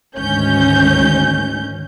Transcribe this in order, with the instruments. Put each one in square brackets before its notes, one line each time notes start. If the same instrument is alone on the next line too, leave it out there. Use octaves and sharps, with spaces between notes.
[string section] D2 G#2 D#3 C#4 G6